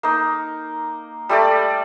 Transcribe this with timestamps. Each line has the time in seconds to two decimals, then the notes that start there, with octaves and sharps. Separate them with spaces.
0.03 A#3 D#4
1.29 G3 A3 G4 D5